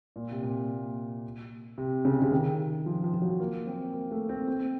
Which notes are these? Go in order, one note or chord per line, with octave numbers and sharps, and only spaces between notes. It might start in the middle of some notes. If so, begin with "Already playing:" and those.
A#2
C3
A#2
C3
C#3
C3
C#3
D#3
F3
F3
F3
F#3
A#3
C4
A#3
A3
C4
C4